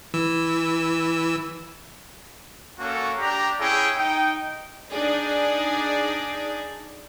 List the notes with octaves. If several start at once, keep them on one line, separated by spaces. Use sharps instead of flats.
E3 E6
A#3 C#4 F#4 A4
D4 G4 A#5
C#4 E4 G#4 G5
D#4 G5
D4 D#4 G#4 D5